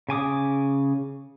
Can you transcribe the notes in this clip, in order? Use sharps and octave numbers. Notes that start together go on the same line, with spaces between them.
C#3 G#5 D6 D#6